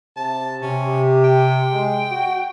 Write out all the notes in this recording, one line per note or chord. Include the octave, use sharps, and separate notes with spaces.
C3 A5
C3 C#4 G4
G5
G#3
F#4